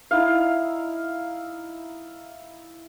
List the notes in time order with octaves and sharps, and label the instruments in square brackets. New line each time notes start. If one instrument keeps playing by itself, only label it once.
[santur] D#4 E4 F5